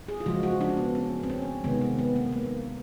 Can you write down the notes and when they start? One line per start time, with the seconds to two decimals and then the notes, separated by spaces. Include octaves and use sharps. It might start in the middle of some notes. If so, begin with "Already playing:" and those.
0.08 G#4
0.20 F4
0.26 C#3 F3 G#3 F#4
0.43 F#4
0.61 D4
0.77 B3
0.95 C#4
1.23 C4
1.30 C#4
1.64 C3 D#3 G#3 B3
1.81 C4
1.99 B3
2.16 A#3
2.33 A#3